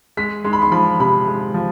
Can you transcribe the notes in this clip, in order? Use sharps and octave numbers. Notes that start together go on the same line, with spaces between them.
G#3 B6
G#3 C6
B5
C6
F3 B5
C3 B5
G#3
F3